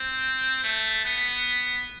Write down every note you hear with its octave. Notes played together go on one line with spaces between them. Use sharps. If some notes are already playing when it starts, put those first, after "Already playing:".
Already playing: C4
A3
B3